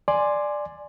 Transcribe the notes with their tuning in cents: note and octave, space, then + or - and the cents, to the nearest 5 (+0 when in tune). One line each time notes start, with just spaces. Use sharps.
D5 +10 G#5 +0 C6 +0